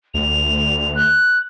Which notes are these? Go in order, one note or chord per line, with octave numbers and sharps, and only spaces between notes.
D2 F7
F#6